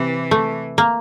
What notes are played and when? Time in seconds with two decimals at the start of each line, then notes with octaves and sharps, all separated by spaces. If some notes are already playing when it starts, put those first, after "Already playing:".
Already playing: C3 E3
0.31 A3
0.78 A#3